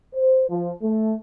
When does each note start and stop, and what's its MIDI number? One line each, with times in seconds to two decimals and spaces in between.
0.15 0.48 72
0.49 0.70 53
0.82 1.15 57